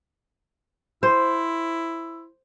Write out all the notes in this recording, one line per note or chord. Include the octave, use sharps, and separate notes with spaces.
E4 C5